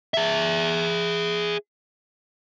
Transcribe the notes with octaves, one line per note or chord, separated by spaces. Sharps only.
G#4 E5